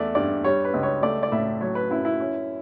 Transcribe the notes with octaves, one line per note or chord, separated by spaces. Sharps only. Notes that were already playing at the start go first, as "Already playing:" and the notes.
Already playing: E2 A3 D5
G2 D5
G3 C#5
B4
C#2
C#5
A3 D5
D5
A2 E5
F#3 C#5
B4
F#2 E4
E4
C#4